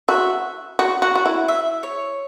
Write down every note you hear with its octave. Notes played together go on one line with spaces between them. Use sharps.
F#4 E5
F#4
F#4
F#4
E4
E5
C#5